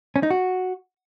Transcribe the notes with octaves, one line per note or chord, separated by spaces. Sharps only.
C#4
D#4
F#4